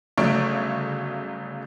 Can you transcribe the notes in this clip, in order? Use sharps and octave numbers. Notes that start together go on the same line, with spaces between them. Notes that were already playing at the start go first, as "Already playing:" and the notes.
G1 C#3 F#3 A3 C#5 D7